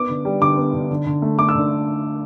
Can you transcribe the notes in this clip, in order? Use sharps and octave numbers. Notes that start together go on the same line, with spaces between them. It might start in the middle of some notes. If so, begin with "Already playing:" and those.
Already playing: B3 D6
D3
G3
D3 D6
B3
D3
D3
D3
A3
A3 D6
E6
D3